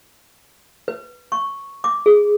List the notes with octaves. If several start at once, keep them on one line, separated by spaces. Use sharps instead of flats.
B4
C#6
D6
G#4